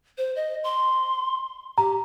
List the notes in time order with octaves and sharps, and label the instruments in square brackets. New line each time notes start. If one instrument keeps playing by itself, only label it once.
[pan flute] C5
D#5
C6
[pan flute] G4 [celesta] A#5